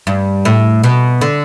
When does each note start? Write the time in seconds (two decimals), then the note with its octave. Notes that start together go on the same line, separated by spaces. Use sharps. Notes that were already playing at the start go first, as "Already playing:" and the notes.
0.07 G2
0.45 A2
0.83 B2
1.21 D3